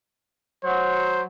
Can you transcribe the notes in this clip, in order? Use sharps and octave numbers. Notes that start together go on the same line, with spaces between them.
F#3 C5